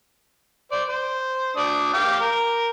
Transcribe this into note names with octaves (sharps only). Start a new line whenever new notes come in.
C5 D5
C5
D4 D5 D#6
F5 G5 D6
A#4